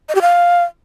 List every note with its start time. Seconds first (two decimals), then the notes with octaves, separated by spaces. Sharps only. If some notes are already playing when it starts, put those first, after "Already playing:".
0.09 D#5
0.15 G4
0.21 F5